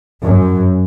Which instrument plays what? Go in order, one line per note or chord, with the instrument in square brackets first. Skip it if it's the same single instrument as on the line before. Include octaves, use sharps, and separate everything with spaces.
[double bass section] F#2